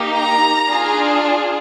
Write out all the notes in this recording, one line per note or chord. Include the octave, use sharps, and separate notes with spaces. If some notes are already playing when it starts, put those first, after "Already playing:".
Already playing: A#3 D#4 G4
A#5
D4 F4 G#4